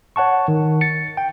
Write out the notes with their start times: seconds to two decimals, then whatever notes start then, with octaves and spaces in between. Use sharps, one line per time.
0.16 C#5 F#5 A5 C#6
0.48 D#3
0.81 A6 C#7
1.17 G5